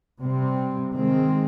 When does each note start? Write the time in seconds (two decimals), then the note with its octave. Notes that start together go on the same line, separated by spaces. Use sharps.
0.22 C3 G3 C4
0.94 D#3 G#3 C4